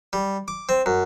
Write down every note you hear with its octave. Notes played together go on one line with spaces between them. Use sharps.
G3
D6
C4
F#2